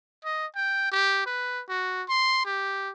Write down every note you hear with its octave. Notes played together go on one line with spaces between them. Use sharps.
D#5
G5
G4
B4
F#4
C6
G4